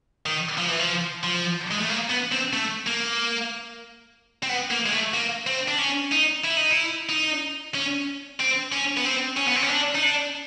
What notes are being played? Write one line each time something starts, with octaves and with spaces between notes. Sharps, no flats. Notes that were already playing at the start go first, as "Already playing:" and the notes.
D#3
F3
E3
F3
F3
G#3
A3
A#3
B3
C4
A3
A#3
C4
B3
A#3
G#3
A3
A#3
C4
D4
C#4
D#4
E4
D#4
E4
D#4
C#4
C4
C#4
B3
C4
C#4
B3
C4
C#4
D4
D#4
D4